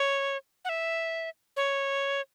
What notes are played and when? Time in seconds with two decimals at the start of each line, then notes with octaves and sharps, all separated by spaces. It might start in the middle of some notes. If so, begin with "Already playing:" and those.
Already playing: C#5
0.65 F#5
0.69 E5
1.57 C#5